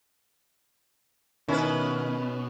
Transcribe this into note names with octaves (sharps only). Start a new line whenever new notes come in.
B2 D#3 C#4 E4 B4